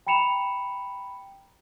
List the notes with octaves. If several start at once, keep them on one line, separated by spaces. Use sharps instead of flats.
G5 A#5 B5 C#7 E7 F7